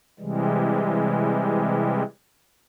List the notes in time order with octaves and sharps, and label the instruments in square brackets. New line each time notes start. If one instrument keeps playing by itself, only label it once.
[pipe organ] C3 E3 G3 G#3